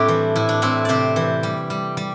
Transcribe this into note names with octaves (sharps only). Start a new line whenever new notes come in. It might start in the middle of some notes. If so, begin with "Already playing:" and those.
Already playing: A2 G3 A3 C4 D4 E4 G4
E3
A2 E4
D4
A2 C4 E4
C3 G4 C5 D5
E3
G3
G3
G3